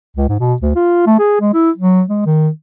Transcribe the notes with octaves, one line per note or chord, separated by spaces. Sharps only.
C#2
G#2
B2
D2
F4
A3
G#4
G#3
E4
F#3
G#3
D#3